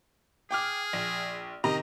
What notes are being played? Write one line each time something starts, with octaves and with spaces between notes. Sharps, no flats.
G#4 G5 D6 F6
A#1
C3 D#3 D#5 A#5